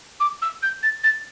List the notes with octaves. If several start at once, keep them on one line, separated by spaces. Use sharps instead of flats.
D6
E6
G6
A6
A6